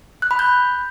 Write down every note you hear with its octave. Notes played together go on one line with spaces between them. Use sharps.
F#6
B5
G6